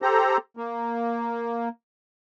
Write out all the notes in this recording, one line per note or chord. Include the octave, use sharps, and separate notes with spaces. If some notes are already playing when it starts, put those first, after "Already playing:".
G4 A4 C5 A#5
A#3